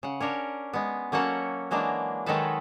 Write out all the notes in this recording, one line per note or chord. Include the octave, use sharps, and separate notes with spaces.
C#3 F#5
C#4 D4 A#4 C#5
G#3 B3
F#3 A#3 C#4 A4 F#5
E3 F#3 G#3 A#3 D4
D#3 F#3 G#3 D#4 A4 B4